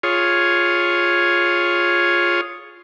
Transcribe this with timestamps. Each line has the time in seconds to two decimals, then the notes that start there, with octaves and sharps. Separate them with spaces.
0.03 F4 G#4 C#5